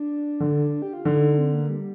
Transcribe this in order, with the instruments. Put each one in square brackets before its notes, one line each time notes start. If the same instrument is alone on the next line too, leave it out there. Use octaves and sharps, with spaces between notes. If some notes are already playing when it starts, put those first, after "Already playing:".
Already playing: [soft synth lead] D4
[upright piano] D3
[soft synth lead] G4
F4
[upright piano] D3 [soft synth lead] D#4
[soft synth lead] D#4
C4
A#3
G3